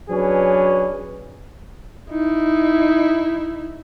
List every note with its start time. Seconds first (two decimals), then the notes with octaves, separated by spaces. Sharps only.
0.10 F#3 C#4 D4 G#4 B4
2.11 D#4 E4